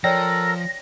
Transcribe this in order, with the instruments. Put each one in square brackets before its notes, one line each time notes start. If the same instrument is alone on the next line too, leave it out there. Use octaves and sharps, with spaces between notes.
[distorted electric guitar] F3 [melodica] A4 A#4 [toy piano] C#5 D5 G5 [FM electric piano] A#6